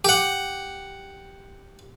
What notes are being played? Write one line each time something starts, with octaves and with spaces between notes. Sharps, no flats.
G4 F#5